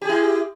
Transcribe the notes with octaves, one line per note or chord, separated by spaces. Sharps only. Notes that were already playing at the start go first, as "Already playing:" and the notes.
E4 G4 G#4